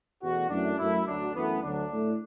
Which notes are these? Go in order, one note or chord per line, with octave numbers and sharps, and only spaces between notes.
E2 B2 A3 F#4
F#2 E3 A3 D4
F#2 F#3 A3 E4
D2 D3 F#3 D4
F#2 E3 A3 B3
D2 D3 F#3 D4
A2 A3